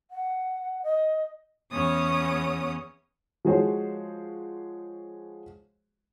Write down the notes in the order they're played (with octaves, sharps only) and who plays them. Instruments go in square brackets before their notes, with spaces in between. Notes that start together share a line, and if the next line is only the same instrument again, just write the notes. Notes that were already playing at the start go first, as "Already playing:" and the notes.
[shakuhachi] F#5
D#5
[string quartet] E2 B3 C#4 C#5 D#6
[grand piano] F3 G#3 F#4 G#4 C5 C#5